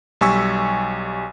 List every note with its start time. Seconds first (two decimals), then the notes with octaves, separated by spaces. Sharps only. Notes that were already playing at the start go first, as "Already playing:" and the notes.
0.21 B1 G3 G#5 C#6 E6 B6